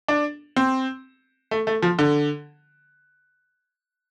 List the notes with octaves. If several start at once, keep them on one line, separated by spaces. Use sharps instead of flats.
D4
C4
A3
A3
F3
D3